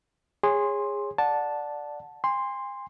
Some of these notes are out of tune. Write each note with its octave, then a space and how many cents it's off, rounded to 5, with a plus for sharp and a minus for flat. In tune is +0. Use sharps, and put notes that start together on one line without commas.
G#4 -20 C#5 -5 C6 +5
D5 +0 F#5 -20 A5 -5
G#5 -45 C6 +0